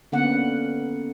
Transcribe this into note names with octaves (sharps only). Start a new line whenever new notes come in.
D3 A#3 B3 C#4 F#5